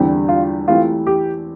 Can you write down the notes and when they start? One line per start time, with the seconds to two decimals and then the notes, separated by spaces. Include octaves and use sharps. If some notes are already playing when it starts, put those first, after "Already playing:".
Already playing: E2 D3 G3 C4 G4
0.29 F4
0.68 E3 A3 C4 F4 G4
1.07 G4